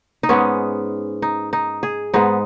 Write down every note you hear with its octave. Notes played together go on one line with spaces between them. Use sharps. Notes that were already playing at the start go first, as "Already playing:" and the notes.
D#4
G#2 G#3 B3 C#4
D#4
D#4
G#4
G#2 G#3 B3 D#4